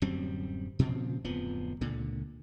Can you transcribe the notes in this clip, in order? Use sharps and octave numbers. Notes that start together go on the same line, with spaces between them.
D1 F#2 G3 C4
A#2 C#3 F3 C4
D1 F2 F3 B3
C#2 A#2 D3